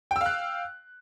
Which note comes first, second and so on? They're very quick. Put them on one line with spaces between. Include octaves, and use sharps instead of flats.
G5 E6 F5 F#6